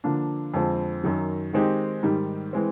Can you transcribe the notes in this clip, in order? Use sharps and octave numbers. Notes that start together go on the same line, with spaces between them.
D3 F3 A#3 D4
F2 D3 F3 G#3 C4
F#2 D#3 F#3
D#3 G#3 C4 D#4 G4
G#2 D#3 G3
E3 G#3 C4